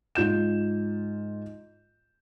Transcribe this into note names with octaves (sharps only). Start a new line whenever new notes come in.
G#2 F4 G6 E7